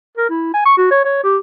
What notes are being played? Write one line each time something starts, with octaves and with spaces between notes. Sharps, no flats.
A#4
E4
G#5
C#6
F#4
C#5
C#5
G4